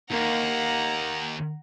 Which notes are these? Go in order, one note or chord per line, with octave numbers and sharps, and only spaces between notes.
D#2 A#3 F#5 A#5